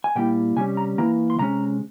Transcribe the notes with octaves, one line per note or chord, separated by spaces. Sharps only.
G#5
A#2 G3 A#3 E4 G5
C3 G3 C#4 G#5
A#5
E3 A#3 E4 A#5
C6
C3 E3 G#3 C#4 A#5